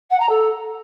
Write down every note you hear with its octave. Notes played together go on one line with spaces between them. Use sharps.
F#5
A#5
A4